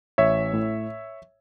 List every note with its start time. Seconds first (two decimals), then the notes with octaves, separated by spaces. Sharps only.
0.18 A1 C#5 E5
0.53 A2